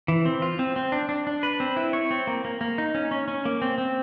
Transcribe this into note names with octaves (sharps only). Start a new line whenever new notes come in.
E3
C4
F4
C4
C4
D4
D4
D4
B4
C4
E4
C#5
C4
A#3
A#3
A#3
D#4
C#4
C#4
C#4
A#3
C4
C4